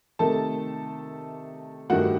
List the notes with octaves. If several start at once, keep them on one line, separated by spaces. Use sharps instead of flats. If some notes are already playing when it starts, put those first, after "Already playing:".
C3 D#3 A3 A4 A5
G2 D#3 A3 F#4 F#5